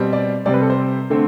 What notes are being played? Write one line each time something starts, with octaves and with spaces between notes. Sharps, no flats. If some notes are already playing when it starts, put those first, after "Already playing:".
Already playing: B2 G3 C4
D5
C3 G3 C4 D5
B4
A4
C5
D3 A3 C4